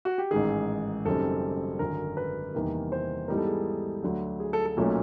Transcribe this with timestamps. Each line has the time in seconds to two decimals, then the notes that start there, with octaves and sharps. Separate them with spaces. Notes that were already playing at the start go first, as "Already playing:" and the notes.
0.05 F#4
0.18 G4
0.31 A1 G#2 D#3 G#4
1.05 F#1 F#2 D#3 G3 C4 A4
1.79 G#1 F#2 D3 A#4
2.17 B4
2.54 E2 C3 D#3 G3 A#3
2.92 C5
3.28 G#2 E3 G3 B3 D#4 A#4
3.38 A4
3.47 G#4
4.03 D2 D3 F#3
4.40 G#4
4.53 A4
4.66 A4
4.77 B1 A#2 F#3 A3 C#4